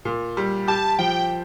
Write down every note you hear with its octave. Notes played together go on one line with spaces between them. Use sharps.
A#2
G3
G4 A5
F3 G5